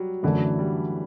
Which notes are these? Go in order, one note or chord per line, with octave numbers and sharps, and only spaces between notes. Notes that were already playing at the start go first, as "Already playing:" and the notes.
Already playing: F#3 G3 G4
F#2 D3 E3 A3 D4
F#3
G3